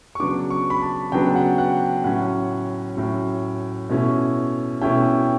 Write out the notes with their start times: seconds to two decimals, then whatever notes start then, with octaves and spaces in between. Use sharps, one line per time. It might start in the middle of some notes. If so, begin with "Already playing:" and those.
0.15 C#6
0.20 C#3 F#3 B3 D4 D6
0.50 C#6
0.70 B5
0.82 A5
1.12 C#3 F#3 B3 D4 G5
1.36 F#5
1.58 F#5
2.04 A2 F#3 C#4 F#5
2.97 A2 F#3 C#4
3.89 B2 A3 C#4 E4
4.81 B2 A3 C#4 E4 G5